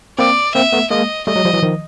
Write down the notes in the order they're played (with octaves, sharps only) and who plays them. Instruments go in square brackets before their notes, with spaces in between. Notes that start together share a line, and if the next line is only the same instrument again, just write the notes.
[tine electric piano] A#3 C4 [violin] D5
[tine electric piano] A#3 C4 [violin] E5
[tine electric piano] A3 B3
[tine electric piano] G#3 A#3 [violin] D#5
[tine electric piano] G3 A3 [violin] D#5
[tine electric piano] F#3 G#3
F3 G3
E3 F#3
D#3 F3